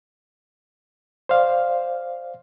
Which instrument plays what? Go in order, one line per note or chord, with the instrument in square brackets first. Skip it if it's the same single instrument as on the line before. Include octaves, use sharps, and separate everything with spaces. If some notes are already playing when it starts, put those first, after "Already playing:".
[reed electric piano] C5 D5 F5